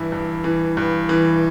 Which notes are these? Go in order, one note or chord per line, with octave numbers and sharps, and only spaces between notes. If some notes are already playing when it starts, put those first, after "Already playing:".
Already playing: G2 E3 E4
G2
E3
G2
E3